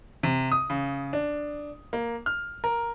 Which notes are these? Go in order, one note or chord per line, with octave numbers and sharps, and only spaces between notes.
C3
D#6
C#3
D4
A#3
F6
A#4